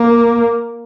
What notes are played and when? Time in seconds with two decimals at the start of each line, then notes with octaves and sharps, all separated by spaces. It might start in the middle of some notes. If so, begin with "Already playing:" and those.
Already playing: A#3